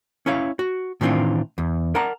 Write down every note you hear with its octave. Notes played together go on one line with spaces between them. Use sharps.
C#4 E4 C#5 F5
F#4
A2 D#3 E3 C4 D4 F4
E2
A#4 D5 F#5 A5 A#5